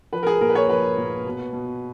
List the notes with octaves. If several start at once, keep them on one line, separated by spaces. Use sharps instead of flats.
F3 B4
A#4
G#4
A#2 A#4
B4
C#5
F3 B4
A#2
B2
B2